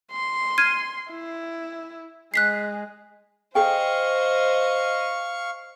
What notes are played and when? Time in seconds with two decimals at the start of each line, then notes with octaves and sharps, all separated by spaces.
0.12 C6
0.58 F6 G#6 D#7
1.11 E4
2.34 G#3 F#6 B6 C7
3.55 G#4 C5 D#5 F5 G5 C#6